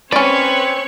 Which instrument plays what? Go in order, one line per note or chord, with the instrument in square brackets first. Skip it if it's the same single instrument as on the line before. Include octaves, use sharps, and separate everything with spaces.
[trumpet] C4 [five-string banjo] C#4 D5 [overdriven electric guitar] B4 [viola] C#5 C#6